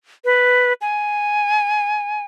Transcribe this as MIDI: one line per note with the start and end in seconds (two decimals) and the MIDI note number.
0.25 0.73 71
0.81 2.25 80